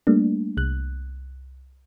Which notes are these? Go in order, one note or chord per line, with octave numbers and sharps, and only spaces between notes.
G3 A3 A#3 D4
C2 F#6